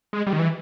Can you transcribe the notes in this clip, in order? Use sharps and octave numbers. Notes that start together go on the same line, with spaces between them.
G#3
G3
D#3
E3